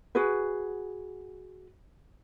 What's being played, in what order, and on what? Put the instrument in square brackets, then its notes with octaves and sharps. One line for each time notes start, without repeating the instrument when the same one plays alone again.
[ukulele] F#4 G#4 B4